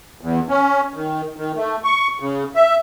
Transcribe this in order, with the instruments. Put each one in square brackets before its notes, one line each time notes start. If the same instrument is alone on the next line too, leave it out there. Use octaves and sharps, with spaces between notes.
[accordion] E2
C#4
D#3
D#3
A3
C#6
C#3
E5